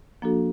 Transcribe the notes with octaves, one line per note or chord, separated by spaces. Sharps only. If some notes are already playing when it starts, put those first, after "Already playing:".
F3 A#3 D4 F#4 A4